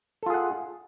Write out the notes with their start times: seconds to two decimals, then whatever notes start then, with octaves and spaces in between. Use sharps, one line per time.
0.23 A4
0.26 F4
0.30 G#4
0.34 F#5